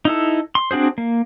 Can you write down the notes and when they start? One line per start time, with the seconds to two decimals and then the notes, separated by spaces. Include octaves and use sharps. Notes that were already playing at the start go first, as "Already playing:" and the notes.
0.05 D#4 E4 A4
0.55 C6
0.71 C4 D4 F#4 G#4 C5
0.98 A#3